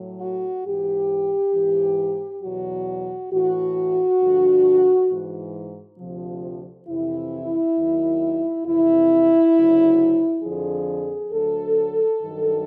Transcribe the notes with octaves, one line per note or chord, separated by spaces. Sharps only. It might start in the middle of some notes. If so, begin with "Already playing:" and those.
Already playing: A2 F#3
F#4
G#2 E3 G4
G#2 E3
E2 B2 F#3 F#4
A2 E3 F#4
G2 D3 F3
G#2 E3
D2 C3 F3
F2 C3 E3 E4
D#2 D#3 F#3
F2 C3 E3 E4
D2 C#3 F#3
F2 D3 F3 G#4
D2 D3 F#3 A4
G2 D#3 F#3